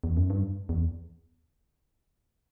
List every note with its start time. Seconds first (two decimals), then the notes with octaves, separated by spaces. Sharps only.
0.04 E2
0.17 F#2
0.30 G2
0.69 E2